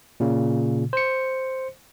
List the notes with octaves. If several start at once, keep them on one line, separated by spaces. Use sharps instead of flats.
A#2 C#3
C5 C#7